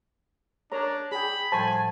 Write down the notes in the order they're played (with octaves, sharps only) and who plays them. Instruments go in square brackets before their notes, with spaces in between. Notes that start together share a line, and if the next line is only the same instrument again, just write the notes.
[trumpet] D4 [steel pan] A#4 C#5 A#5
[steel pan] G#4 G5 [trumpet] B5
[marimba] A2 F3 G3 [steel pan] C5 [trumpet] G#5 [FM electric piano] A5